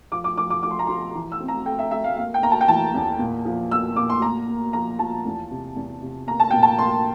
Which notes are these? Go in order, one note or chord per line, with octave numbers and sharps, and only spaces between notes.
F3 D6
D6
F3 D6
D6
F3 D6
C6
A#5
F3 C6
E3
E6
C4
A#5
A3 G5
E5
A3 E5
F5
A#3 F5
G5
A#3 A#5
A5
G5
E3 A5
E2
A#2
F3
A#3 E6
A#2 D6
C6
A#3 A#5
A#3
F3 A#5
F3 A5
E2
C3
E2
C3
A#3 A#5
A5
A#2 G5
A5
A#3 C6